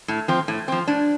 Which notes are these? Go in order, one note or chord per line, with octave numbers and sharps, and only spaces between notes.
A2
F3 C4
A2
F3 C4
A2 D4